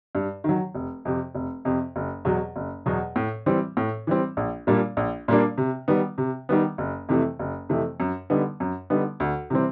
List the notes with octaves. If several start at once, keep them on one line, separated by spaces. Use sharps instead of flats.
G2
D#3 F#3
F1
F2 C3
F1
F2 C3
F#1
E2 B2 F#3
F#1
E2 B2 F#3
A2
E3 G3 C4
A2
E3 G3 C4
A#1
A#2 G3 A#3 D4
A#1
A#2 G3 A#3 D4
C3
D#3 G3 B3
C3
D#3 G3 B3
F#1
F2 C3 E3 A3
F#1
F2 C3 E3 A3
F#2
D3 G3 B3 D#4
F#2
D3 G3 B3 D#4
D2
C3 E3 G3 C4